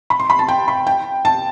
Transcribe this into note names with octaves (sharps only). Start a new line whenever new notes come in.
B5
C6
B5
A5
G5
B5
G5
A5